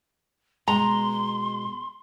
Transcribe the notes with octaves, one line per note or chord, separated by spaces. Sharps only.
B2 G#3 A#5 C6